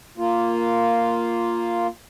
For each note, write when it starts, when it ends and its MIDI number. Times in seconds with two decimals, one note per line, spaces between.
0.17 1.87 58
0.17 1.87 65